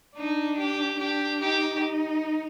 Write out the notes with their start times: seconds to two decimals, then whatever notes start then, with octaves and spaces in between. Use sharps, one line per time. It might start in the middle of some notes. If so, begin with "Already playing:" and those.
0.15 D4 D#4
0.57 G4
0.99 D4 G4
1.41 D#4 G4